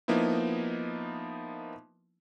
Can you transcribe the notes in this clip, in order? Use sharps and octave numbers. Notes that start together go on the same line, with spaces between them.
F3 A#3 B3 D#4 E4